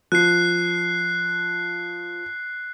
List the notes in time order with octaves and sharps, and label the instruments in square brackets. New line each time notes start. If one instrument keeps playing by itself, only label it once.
[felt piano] F3 [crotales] F#6 C7